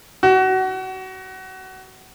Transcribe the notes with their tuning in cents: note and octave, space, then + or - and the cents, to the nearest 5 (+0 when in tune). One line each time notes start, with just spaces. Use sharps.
F#4 +25